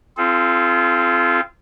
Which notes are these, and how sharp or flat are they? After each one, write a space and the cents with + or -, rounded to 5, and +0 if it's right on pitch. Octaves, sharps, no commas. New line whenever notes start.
C4 +0 F4 -25 A4 -40